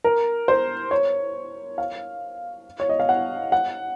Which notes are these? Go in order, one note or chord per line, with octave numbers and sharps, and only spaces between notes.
A#4
C5
C#5
F5
C#5
D#5
F5
F#5
F#5